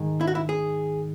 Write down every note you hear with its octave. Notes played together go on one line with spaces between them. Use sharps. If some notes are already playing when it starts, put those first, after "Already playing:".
Already playing: G#2 D#3 G#3
E4
F#4
E4
G#4